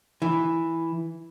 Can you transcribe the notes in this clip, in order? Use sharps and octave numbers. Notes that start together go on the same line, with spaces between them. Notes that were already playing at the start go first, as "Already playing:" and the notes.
E3